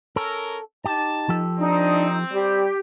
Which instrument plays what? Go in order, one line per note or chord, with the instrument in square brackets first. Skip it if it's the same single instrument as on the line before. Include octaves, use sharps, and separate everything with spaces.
[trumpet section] C#4 A#4 [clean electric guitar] A4
[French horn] D#4 [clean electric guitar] G4 [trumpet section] A5
[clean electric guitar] F3 G4 A4
[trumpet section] C4 [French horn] D4 [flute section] D#4
[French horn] G3 [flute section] G4